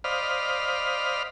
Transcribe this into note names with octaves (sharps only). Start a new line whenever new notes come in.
C5 D5 D#5 F5 B5 F6